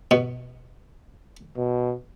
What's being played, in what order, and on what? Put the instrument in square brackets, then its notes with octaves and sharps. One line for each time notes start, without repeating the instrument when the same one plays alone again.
[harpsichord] B2
[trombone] B2